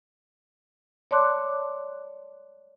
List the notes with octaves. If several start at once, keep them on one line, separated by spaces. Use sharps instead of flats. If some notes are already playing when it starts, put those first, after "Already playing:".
C#5 D5 A5 C6 D6 F#6